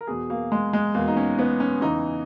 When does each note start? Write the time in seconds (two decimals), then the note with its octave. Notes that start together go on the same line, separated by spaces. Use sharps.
0.01 A#4
0.07 E2 B2 G#4
0.30 A#3
0.52 G#3
0.73 G#3
0.94 E2 B2 A#3
1.08 D#4
1.16 C#4
1.39 B3
1.60 C#4
1.82 E2 C#3 E3 D#4